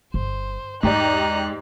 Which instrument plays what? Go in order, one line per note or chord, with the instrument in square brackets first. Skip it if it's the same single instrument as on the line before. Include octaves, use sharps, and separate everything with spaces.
[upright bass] G1 [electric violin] C5
[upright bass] E2 [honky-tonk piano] G#2 G4 D5 [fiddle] D#4 [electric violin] A#5 F#6